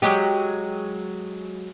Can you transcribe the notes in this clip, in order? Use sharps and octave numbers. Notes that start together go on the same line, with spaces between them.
F#3 G#3 G4